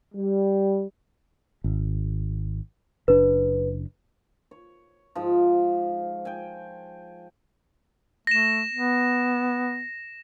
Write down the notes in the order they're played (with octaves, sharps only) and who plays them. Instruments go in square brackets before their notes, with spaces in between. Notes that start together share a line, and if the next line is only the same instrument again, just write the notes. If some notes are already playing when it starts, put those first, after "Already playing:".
[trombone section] G3
[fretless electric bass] G#1
[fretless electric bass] F#1 D4 [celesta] B4
[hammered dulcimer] C#5
G#2 F3
G5 G#5
[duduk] A3 [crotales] A#6 E7
[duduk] B3